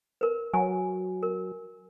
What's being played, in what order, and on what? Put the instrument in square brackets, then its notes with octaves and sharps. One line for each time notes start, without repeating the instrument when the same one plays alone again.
[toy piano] A#4 B4
[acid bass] F#3 [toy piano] G#5
[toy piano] A#4